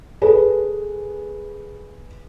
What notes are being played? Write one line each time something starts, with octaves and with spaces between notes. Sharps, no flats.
G#4 A4 B4